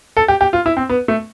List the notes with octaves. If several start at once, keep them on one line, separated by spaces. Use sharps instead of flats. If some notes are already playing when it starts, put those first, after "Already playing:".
A4
G4
G4
F4
E4
C4
B3
A3